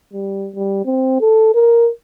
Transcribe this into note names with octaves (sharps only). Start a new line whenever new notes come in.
G3
G3
C4
A4
A#4